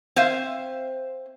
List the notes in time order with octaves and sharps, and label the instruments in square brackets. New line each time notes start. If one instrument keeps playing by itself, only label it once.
[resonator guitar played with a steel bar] C4 C5 E5 F5